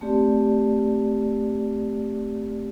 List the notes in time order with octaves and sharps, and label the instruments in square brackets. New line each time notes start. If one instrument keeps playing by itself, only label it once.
[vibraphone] A3 C4 G4 D5